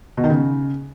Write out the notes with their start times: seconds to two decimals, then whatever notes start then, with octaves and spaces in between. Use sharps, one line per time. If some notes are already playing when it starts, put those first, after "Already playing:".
0.17 B2
0.24 D#3
0.30 C#3